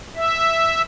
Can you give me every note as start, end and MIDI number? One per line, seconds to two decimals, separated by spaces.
0.15 0.82 76